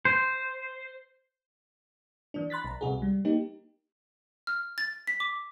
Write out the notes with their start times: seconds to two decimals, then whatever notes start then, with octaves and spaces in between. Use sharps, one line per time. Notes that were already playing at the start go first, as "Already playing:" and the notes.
0.05 C5
2.34 E3 D4
2.50 B5 C6 F#6 A6 B6
2.64 B1 A#5
2.81 C2 C3 F#4 G#4
3.02 G3
3.25 A#3 D#4 G4
4.47 F6
4.78 A6
5.07 B6
5.20 D6